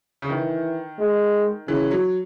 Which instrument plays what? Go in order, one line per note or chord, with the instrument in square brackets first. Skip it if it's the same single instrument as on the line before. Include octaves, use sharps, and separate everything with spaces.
[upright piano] C#3
[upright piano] D#3 [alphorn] E3
[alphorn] G#3
[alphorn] C#3 [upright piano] E3
[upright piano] F#3